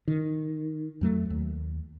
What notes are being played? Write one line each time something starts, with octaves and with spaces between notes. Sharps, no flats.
D#3
F2 F#3 A3
D#2